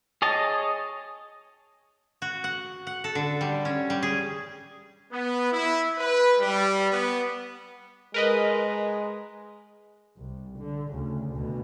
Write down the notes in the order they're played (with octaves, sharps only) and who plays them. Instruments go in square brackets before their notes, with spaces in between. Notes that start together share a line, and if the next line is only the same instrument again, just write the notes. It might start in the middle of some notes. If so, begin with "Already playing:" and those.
[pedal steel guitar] G#4 C#5 D#5 A5
[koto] F#4
F#5
F#5
A4
D3
G3
C#4
G3
G#4
[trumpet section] B3
E4
B4
G3
B3
[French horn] G#3 [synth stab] A#4 B4 D#5
[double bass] C2
D3
D2 C#3
D2 B2